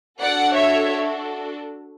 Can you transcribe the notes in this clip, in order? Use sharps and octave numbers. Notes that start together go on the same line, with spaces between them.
D4 F#4 A4 D5 F#5
C#5 E5